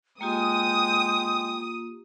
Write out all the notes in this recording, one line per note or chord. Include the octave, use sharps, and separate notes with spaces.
G#3 A#3 F4 G4 G5 D#6